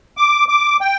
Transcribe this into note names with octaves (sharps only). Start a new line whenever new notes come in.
D6
D6
G5